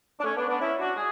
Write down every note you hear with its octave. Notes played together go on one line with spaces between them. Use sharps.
D4
A3 C#4
B3 D4
B3 D4
C#4 E4
D4 F#4
G#4